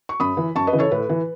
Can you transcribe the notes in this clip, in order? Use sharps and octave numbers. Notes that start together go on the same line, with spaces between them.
C#6
F#2 B5 D#6
E3
F#2 A5 C#6
B4 D#5
C#3 E3
A4 C#5
A2 B4
E3